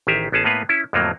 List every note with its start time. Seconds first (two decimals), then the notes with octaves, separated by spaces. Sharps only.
0.07 A1 D#3 G4 G#4 E5 A#5
0.32 A1 B3 C#4 G#4 A5
0.44 A2 A#3 B3 B4 F5 G#5
0.69 C#4 E4
0.93 F2 A2 D3 F3 F#3 A#3